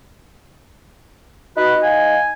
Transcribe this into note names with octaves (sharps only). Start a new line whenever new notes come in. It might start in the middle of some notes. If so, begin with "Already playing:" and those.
D#4 F#4 B4
F5 G#5